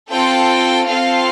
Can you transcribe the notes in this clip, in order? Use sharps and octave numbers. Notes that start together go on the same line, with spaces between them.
C4 F4 A4 G5
C4 F4 A4 F5